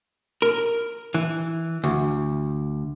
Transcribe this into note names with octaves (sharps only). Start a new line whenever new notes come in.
A#4
E3
D2